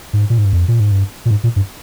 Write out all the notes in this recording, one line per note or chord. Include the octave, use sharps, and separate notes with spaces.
G#2
A#2
G#2
G2
F2
A#2
G#2
G2
A#2
G#2
A#2
G2